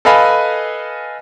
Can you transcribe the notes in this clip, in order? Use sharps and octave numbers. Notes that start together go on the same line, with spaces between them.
A4 B4 D#5 F5 G#5 B5